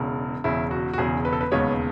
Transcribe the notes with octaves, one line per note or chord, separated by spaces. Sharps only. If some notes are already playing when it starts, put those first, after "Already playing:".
Already playing: E1 E2 C#3
E1 E2 C#3 E4
F#4
F#4
E1 E2 C#3 G#4
B4
A4
B4
E1 D#2 C#3 G#3 B3 C#5